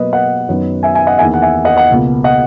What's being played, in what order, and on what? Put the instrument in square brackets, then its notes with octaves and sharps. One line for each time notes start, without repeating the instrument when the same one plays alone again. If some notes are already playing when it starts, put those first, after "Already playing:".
Already playing: [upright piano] B2 F#3 A#3 B4 D#5
D#5 F#5
F#2 D#3 F#3 B3
E5 G#5
E5 G#5
D#5 F#5
E2 D#3 A#3 E5 G#5
F#5
E5 G#5
D#5 F#5
D#5 F#5
C#2 B2 A#3
D#5 F#5